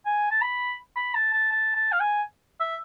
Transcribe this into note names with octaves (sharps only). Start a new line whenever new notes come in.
G#5
A5
B5
B5
A5
A5
A5
A5
F5
G#5
E5